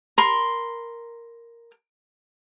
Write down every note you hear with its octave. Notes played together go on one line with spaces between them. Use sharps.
A#4 B5 C6